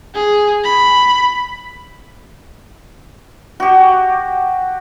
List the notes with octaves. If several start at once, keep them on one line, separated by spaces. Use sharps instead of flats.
G#4
B5
F#4 G4